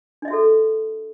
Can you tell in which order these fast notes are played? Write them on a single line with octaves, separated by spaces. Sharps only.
D4 D#5 E5 F#4 A4